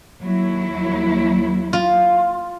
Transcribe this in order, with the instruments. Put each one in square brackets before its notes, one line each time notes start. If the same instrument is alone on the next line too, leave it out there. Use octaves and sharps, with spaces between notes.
[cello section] D#2 F#3 E4
[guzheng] F4